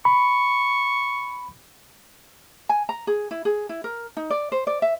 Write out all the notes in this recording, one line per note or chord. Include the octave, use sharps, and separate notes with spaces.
B5 C#6
G#5
A#5
G#4
E4
G#4
E4
A#4
D#4
D5
C5
D5
E5